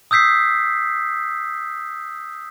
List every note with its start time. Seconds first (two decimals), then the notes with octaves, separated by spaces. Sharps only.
0.11 D#6 E6 G6 B6 C7